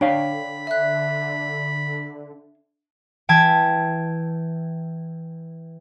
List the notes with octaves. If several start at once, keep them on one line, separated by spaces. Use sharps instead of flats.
D3 D4 C#5 F5 G5 B5
E5 F#6
E3 G5 A5 G#6 B6